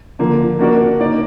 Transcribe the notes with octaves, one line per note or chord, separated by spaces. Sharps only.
D3 F3 A#3
A#3 D4 F#4 A#4 D5
A#3 D#4 A#4 D5